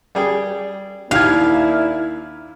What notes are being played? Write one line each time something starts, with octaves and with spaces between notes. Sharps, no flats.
G3 G#4 G5
D#2 A#3 D4 E4 G4 F5 F6 G#6